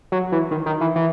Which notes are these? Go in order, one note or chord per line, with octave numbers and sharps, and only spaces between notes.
F#3
E3
D#3
D#3
E3
E3